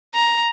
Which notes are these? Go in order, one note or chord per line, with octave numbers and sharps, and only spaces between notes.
A#5